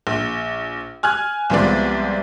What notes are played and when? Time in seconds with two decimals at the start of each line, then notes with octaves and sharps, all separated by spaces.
0.07 A#1
1.03 G#5 F6 F#6 G#6
1.50 C2 F3 G#3 B3 C4 D5